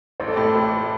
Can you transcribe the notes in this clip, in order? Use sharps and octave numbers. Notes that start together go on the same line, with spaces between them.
A1 C5
A4
A2 G4
A4
A3